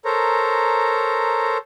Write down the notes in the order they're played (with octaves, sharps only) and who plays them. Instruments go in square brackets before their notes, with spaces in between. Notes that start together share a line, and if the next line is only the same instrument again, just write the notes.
[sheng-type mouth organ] A4 A#4 C5 C#5 A#5